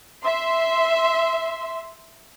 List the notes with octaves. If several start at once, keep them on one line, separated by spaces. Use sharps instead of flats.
E5 C6